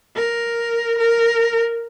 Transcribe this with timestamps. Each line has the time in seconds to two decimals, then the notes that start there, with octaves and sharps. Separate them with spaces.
0.16 A#4
0.98 A#4